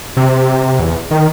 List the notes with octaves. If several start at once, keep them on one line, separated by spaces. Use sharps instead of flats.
C3
E2
D#3